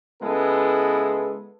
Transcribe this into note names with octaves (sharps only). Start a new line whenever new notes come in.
C#3 G#3 B3 E4 A4 B4